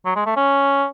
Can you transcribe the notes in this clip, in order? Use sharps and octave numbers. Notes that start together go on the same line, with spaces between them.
F#3
G#3
A3
C#4